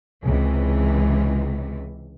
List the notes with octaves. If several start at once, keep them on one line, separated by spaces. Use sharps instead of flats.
C#2 C3 E3